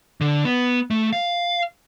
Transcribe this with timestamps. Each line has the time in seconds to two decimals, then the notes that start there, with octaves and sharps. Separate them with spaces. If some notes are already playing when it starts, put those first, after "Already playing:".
0.21 D3
0.45 B3
0.91 A3
1.13 F5